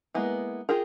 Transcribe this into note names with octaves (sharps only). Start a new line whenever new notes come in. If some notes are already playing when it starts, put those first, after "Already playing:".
G#3 A#3 B3 E4
F4 G4 G#4 A#4